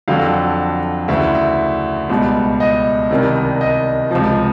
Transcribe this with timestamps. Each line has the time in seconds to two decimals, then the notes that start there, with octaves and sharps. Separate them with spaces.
0.08 F2 D3 F#3 F5
1.08 D2 C#3 E3 E5
1.35 E5
2.10 C#2 B2 G3
2.60 D#5
3.10 C2 C3 D#3 G3
3.61 D#5
4.11 C#2 C3 F3